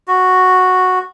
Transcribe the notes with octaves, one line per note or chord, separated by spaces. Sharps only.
F#4